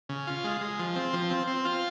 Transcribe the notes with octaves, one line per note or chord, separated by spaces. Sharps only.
C#3
F4
G#3
G#3
F3
C4
F3
C4
C4
F4